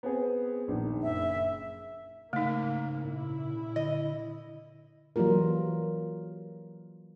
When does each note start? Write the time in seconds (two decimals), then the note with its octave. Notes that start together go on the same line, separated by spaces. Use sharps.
0.03 B3 C4 G#4
0.68 A#1 D#3
1.03 F#1 E5
2.33 G#2 C#3 A3 A#3 D#4
3.05 A#2 E4
3.76 D3 D#5
5.16 E3 F#3 G3 A#3 F4 A#4